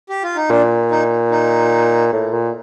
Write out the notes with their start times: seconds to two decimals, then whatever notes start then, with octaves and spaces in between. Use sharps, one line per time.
0.09 G4
0.23 F4
0.36 D#4
0.50 A#2 D4
0.91 D#4
1.31 D#4
2.13 A2
2.33 A#2